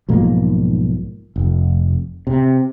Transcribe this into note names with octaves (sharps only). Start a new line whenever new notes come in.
B1 G#2 F3 A#3
F1
C3